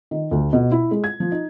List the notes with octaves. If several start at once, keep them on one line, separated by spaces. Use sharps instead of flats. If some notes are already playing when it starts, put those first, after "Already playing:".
D#3
D2
B2
E4
G#3
G#6
F3
D#4